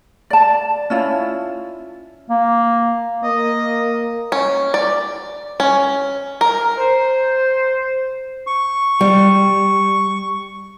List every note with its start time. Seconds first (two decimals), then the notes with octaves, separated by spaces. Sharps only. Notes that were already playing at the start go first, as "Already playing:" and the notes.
0.30 D5 A5
0.90 C#4 E4 F4
2.30 A#3
3.24 A#3 D#5
4.32 C#4
4.74 D5
5.60 C#4
6.41 A#4
6.78 C5
8.47 C#6
9.01 G3